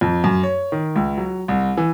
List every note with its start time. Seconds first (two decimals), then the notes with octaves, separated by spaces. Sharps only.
0.01 F2
0.24 F#2
0.43 C#5
0.72 D#3
0.96 C#2
1.17 F#3
1.48 C2
1.77 E3